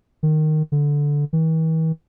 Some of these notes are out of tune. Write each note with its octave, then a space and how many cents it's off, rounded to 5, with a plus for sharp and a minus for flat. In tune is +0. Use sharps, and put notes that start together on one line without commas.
D#3 -10
D3 -10
E3 -45